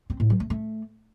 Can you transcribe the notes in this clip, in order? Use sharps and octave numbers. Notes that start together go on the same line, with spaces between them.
C4
A2
F#3
A3
A3